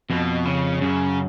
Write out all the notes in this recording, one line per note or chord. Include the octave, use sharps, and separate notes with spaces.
F2 B2
C#3
F#2 C#3